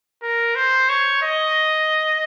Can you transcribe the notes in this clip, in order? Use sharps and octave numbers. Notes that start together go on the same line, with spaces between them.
A#4
C5
C#5
D#5